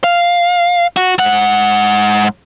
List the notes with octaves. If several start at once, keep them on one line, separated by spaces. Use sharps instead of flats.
F5
F#4
G#2 F#5